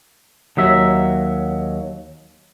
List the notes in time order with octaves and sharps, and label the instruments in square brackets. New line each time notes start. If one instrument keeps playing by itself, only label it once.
[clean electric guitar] D#2 F#3 E5